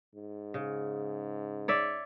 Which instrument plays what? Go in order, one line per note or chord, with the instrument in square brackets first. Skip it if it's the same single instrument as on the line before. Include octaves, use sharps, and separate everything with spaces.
[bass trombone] G#2
[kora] C#3
C#5 D5 E5